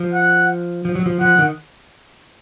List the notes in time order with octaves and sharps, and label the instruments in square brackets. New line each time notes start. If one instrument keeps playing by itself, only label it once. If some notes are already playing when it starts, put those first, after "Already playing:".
Already playing: [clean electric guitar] F3
[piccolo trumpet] F#5
[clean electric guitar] F3
F#3
F3
[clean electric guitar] F3 [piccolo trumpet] F#5
[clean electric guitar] D#3